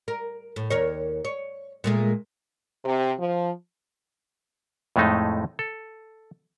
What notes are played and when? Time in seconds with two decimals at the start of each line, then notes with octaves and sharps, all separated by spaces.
0.08 A#4
0.56 A2
0.70 D#2 A#4 C#5
1.25 C#5
1.84 A#2 G#3 A3
2.85 C3
3.19 F3
4.96 F2 A2 G#3 A3 D#4
5.59 A4